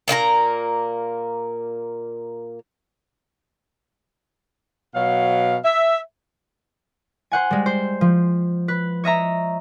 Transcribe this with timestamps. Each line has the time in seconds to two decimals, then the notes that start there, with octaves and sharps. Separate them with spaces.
0.08 A#2 A#3 F4 A#5
4.95 B2 F#3 F5
5.65 E5
7.32 C5 F#5 G#5
7.51 G3 G#3
7.66 C5
8.01 F3
8.68 B4
9.04 C#5 D#5 E5 A#5